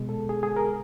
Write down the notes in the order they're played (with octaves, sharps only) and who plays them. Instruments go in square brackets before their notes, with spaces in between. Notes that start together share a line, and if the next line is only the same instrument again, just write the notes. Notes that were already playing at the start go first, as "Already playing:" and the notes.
Already playing: [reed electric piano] B2 G#3
A4
G#4
G#4
A#4